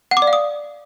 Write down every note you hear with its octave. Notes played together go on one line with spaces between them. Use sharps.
F#5
D6
D5
F5
D#6